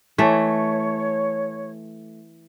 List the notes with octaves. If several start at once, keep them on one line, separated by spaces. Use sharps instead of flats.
E3 A3 C#5